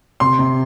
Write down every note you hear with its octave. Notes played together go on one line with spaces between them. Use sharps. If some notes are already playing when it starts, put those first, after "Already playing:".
C3 C6
C3